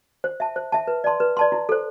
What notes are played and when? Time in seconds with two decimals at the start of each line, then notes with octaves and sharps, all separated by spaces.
0.24 C5
0.40 E5 A5
0.56 C5
0.72 E5 A5
0.87 B4
1.04 D5 A5 C6
1.20 B4
1.37 D5 A5 C6
1.52 E4
1.69 A4 C5